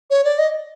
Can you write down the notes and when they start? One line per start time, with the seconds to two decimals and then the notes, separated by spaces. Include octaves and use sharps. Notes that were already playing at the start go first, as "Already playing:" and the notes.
0.10 C#5
0.24 D5
0.39 D#5